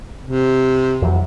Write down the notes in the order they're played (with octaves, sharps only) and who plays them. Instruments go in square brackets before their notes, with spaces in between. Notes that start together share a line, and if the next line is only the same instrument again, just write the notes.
[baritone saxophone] C3
[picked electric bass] F2 E3 F#3